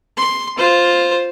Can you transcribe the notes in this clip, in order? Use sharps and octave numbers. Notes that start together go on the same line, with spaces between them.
C6
F4 C5